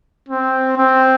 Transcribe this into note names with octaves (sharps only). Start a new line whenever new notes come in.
C4
C4